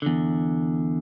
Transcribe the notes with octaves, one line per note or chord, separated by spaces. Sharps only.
E2 D3